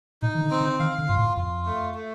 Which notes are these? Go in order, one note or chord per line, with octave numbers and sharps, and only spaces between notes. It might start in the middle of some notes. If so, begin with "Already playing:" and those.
A#2 D#4
D#3
D3
C4
D3
D#3 F5
D3
G2 F4
A2
F2 F4
A3
A3